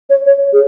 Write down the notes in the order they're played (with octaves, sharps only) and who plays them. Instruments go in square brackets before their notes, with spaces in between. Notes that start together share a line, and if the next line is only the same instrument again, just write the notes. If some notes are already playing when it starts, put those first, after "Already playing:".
[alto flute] C#5
C#5
G#4